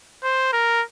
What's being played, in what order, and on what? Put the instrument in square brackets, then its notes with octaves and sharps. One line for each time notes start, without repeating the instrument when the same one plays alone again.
[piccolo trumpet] C5
A#4